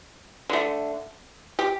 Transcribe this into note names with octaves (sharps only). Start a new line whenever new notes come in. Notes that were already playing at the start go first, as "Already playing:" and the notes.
D3 A3
G4